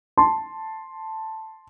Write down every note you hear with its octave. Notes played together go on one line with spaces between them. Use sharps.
A5 C6